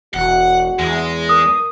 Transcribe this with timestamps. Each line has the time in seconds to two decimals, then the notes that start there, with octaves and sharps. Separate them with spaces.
0.14 E1 F#4 F#5
0.79 E2 G#3
1.29 A#4 D#6